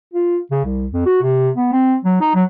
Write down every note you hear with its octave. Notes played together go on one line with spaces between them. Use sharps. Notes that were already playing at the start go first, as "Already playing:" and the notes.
F4
C#3
C2
F2
F#4
C3
B3
C4
F#3
D#4
F#3